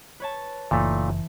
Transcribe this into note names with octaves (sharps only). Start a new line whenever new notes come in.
B4 C#5 A5
F#1 A#2 E3 A3 D#4